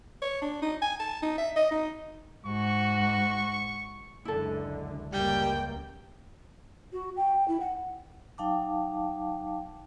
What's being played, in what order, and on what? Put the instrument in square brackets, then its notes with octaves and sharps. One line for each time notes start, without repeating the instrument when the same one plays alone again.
[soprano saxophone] C#5
D4
D#4
G#5
A5
D#4
E5
D#5
D#4
[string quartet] G#2 F#4 [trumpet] C#6
[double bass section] C#2 F#2 D3 [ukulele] E4 A4
[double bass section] C#2 F#2 A#3 [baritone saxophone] G3 [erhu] G5
[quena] F#4
G5
E4
F#5
[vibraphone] F#3 D#4 F5 G5 A5 D6